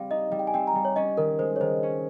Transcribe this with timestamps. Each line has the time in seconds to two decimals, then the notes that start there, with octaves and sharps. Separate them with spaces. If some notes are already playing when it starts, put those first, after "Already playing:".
Already playing: G3 C4 F5
0.11 D#4 D#5
0.31 G3
0.39 G5
0.47 G#5
0.54 C4 G5
0.67 A#5
0.75 G3
0.85 C#5
0.96 C#4 D#5
1.17 D#3 A#4
1.39 G#3 C5
1.56 C#5
1.61 D#3 C5
1.83 C#4